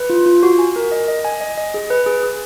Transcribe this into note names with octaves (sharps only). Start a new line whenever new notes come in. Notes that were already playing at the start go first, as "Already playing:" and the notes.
Already playing: B4
F4
F4
F#4
G#5
A#4
D#5
D#5
G#5
D#5
D#5
G#4
B4
G#4
G#4